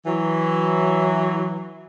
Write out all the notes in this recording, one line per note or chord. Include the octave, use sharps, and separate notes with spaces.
E3 F#3